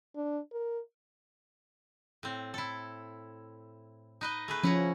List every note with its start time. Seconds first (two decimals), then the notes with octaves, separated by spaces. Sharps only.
0.16 D4
0.52 A#4
2.23 A2 C4
2.54 E4 A4
4.21 D#4 B4 D#5
4.48 A3 G#4 B4
4.63 F3 C#4 E4 F#5 A#5